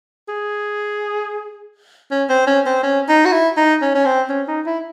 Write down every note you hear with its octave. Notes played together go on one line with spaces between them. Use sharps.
G#4
C#4
C4
C#4
C4
C#4
D#4
F#4
E4
D#4
C#4
C#4
C4
C#4
D#4
E4